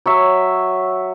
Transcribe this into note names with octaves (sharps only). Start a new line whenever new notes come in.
F#3 C#5 E5